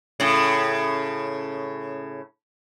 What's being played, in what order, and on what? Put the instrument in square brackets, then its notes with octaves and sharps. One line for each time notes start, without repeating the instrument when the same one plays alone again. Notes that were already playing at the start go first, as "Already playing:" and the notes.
[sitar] A2 C#3